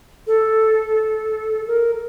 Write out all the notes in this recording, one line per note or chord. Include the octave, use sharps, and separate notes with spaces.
A4
A#4